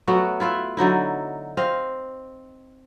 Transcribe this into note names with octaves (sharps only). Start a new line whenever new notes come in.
F#3 A3 B3 F#4
E4 F4 B4 E5
D3 F#3 D#4 E4
C4 D#5 F5